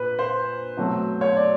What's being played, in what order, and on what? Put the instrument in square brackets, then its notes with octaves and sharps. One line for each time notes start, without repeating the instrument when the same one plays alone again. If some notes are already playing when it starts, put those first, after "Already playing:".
Already playing: [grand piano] A#2 B4
C5
B2 F#3 A3 C4
C#5
D5